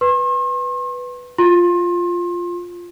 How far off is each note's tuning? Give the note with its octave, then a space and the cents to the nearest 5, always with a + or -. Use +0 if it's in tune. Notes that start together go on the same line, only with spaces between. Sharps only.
B4 +0 C6 +45
F4 +0 C6 +30